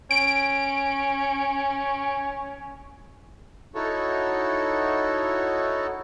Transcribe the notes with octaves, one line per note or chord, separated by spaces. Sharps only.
C#4 D7
D#4 E4 F#4 A4 C#5